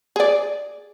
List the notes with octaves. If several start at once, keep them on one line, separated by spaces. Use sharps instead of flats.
G#4 D5